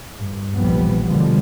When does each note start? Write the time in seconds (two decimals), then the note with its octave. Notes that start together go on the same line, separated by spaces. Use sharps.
0.15 G2
0.54 A#1 D#2 E3 F3 G3 B3
1.06 B2 D3 F3 G3 G#3 B3